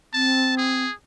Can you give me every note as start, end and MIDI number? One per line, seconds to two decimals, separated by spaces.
0.13 0.84 60
0.13 0.55 81
0.58 0.93 68